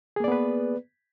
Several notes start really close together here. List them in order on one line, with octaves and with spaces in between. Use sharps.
G#4 A#3 D5 B3 B4